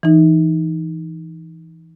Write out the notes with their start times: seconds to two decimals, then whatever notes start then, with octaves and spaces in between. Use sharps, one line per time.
0.03 E3 D#4